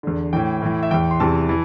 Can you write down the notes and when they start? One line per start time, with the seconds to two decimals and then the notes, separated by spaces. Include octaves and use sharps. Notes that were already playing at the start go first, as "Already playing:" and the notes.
0.03 E2 D3
0.33 A2 E3 G5
0.62 A2 E3
0.83 E5
0.91 E2 E3 G5
1.11 C6
1.20 E2 C3 E3 A5
1.49 E3